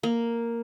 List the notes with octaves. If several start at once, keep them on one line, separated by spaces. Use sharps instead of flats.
A#3